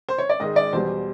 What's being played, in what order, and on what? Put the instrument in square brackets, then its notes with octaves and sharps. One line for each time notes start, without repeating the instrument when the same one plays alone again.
[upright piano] C5
C#5
D5
G#2 D#3 G#3 D#5
D5
E2 B2 G3 C5